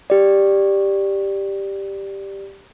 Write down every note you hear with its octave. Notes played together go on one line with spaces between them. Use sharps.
G4 D5